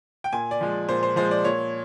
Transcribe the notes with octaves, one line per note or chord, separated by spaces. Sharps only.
G5
A#2 G#5
D5
F3 G#3
A#2 C5
C5
F3 G#3 C5
D5
A#2 C#5